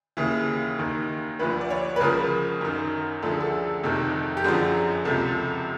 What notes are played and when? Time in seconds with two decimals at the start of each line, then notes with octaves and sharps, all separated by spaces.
0.17 D#2 C#3 E3
0.79 D#2 D#3
1.39 D2 D3 F3 B4
1.61 D5
1.70 C#5
1.96 B4
2.00 C#2 C#3 F3 A#4
2.61 F#2 D#3
3.22 D2 D3 F3 A4
3.31 G#4
3.40 A4
3.84 F2 C3 D#3
4.37 G4
4.44 F#2 D3 F3 G#4
5.05 C#2 C3 F3 A4